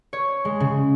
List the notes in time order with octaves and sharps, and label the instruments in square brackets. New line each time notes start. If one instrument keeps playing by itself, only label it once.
[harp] C#5
G#3
C#3